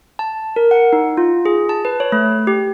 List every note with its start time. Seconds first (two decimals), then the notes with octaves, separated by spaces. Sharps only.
0.19 A5
0.56 A#4
0.71 F#5
0.93 D#4
1.17 F4
1.45 G#4
1.69 A5
1.85 B4
2.00 C#5
2.12 A3
2.47 G4